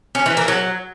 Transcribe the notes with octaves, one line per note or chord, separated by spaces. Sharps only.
C#4
E3
A#3
F#3